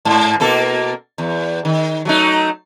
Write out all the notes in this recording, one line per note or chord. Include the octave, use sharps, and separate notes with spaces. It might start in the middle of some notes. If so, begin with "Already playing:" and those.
G#2
B2 A#3 A4
E2
D#3
F#3 A3 D#4